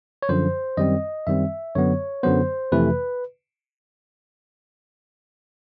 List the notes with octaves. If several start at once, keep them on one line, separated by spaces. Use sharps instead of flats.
C#5
F#2 D3 F3 C5
F#2 D#3 G3 C4 D#5
F#2 D#3 G3 C4 E5
F#2 D3 F#3 B3 C#5
F#2 D3 F#3 B3 C5
F2 C3 E3 A3 B4